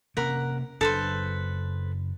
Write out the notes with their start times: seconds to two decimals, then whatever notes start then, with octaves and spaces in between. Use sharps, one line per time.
0.17 C3 A#3 C#4 A#4 F#5 B5
0.81 F#1 F#2 D4 A4 B4 C5